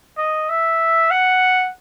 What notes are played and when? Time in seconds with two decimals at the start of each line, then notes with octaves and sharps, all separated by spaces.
0.17 D#5
0.49 E5
1.11 F#5